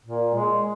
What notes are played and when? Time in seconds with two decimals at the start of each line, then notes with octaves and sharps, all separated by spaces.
0.05 A#2
0.34 G#3